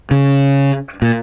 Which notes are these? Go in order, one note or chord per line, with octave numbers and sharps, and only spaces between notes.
C#3
A#2